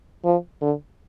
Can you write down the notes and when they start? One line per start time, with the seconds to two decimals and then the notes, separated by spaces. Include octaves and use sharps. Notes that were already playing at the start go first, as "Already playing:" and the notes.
0.25 F3
0.62 D3